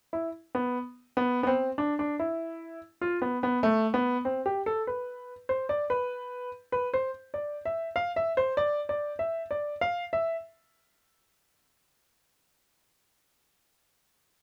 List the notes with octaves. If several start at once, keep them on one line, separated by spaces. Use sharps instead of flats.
E4
B3
B3
B3
C4
D4
D4
E4
F4
B3
B3
A3
B3
C4
G4
A4
B4
C5
D5
B4
B4
C5
D5
E5
F5
E5
C5
D5
D5
E5
D5
F5
E5